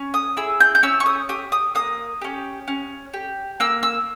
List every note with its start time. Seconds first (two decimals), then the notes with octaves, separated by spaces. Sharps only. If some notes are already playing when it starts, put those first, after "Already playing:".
Already playing: C#4
0.14 D#6
0.37 E4 G#4 E6
0.60 G6
0.75 G6
0.83 C#4 E6
1.00 C#6
1.06 D#6
1.29 G4 D#6
1.52 D#6
1.75 A#3 D#6
2.21 C#4 G4
2.68 C#4
3.14 G4
3.60 A#3 E6
3.83 E6